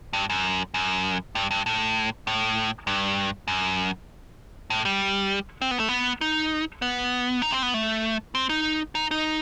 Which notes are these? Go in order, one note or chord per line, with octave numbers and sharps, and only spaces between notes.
G2
F#2
F#2
G2
G2
A2
A2
G2
F#2
A2
G3
C4
B3
A3
B3
D#4
B3
D#4
C4
B3
A3
C4
D#4
D#4
D#4